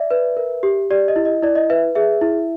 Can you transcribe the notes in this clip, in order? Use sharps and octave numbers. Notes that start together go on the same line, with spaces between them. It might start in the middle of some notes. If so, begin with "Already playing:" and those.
Already playing: D5 E5
B4
A#4
G4
G4 D5
D#5
E4
D#5
E4 D5
D#5
B4 E5
G#4 E5
E4